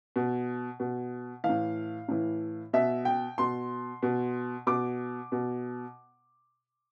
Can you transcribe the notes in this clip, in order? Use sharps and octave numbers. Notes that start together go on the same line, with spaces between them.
B2
B2
E3 F5
A2
A2 E3
B2 E5
G5
B2 C6
B2
B2 D6
B2